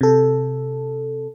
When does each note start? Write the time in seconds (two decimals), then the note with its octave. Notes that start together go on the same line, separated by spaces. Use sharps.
0.01 C3 A4